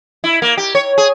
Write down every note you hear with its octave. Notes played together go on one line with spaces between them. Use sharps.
E4
A#3
G4
C#5
G#4